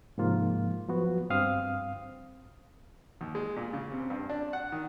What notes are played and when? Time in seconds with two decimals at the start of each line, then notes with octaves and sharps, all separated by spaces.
0.18 G#2 C3 F3 A#3 F4
0.89 F3 F#3 B3 F#4
1.30 G2 C4 F5 D#6
3.21 D#2
3.35 G#3
3.56 A#2
3.73 C#3
3.92 C3
4.10 G2
4.30 D4
4.53 F#5
4.72 D#3